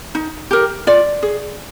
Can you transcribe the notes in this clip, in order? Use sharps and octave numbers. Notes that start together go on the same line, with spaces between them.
D#4
G4 A#4
F4 D5
G#4